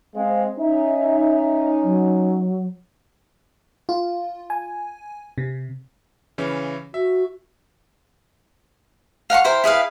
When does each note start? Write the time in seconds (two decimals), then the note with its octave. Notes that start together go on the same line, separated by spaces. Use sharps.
0.15 G#3 C4 F5
0.58 C#4 D#4 E5
1.83 F#3
3.89 F4
4.50 G#5
5.38 C3
6.38 C#3 E3 C#4
6.94 F#4 E5
9.30 F5 F#5 A#5 C#6
9.44 E4 A#4 C5 G5
9.64 E4 G#4 B4 F5